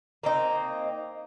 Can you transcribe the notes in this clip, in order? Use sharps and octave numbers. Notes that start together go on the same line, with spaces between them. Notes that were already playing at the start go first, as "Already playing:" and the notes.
A#3 C4 D#4